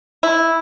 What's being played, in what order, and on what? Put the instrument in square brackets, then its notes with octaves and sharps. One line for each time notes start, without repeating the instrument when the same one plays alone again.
[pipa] E4